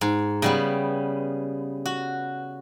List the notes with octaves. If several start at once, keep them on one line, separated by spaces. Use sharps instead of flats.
G#2
C#3 G3 B3
F#4